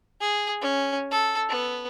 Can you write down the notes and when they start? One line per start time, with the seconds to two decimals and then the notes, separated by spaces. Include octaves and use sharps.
0.21 G#4
0.62 C#4
1.11 A4
1.49 B3